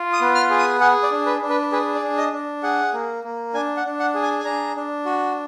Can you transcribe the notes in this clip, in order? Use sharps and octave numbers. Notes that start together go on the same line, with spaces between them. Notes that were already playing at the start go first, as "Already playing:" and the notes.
Already playing: F4
D#6
B3
F6
G#4
D#6
G#4 F#5
D5
D4
B4
D4
B4
G#4 B4
D5
D4
D#5
D4
G#4 F#5
A#3
A#3
D4 G#5
F#5
D4
F#5
G#4
G#5
G#5
D4 A#5
D4
F#4